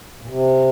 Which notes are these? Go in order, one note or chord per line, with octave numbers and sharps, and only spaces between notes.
A#2
C3